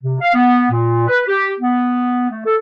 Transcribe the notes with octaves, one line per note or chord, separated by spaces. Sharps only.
C3
F5
B3
A#2
B4
G4
B3
A3
A4